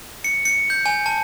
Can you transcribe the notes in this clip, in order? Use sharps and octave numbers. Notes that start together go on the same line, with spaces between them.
C#7
C#7
G6
G#5
A5